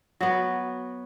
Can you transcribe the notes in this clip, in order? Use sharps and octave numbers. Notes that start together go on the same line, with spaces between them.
F#3 B3